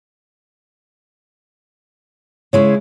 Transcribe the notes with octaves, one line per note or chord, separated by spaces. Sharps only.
C#3 G#3 E4 C#5